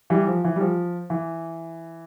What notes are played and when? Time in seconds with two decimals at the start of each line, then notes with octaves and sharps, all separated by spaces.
0.10 E3 G3
0.27 F3
0.44 E3
0.56 G3
0.60 F3
1.10 E3